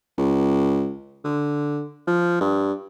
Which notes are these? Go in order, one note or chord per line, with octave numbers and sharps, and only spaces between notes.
C#2
D3
F3
G2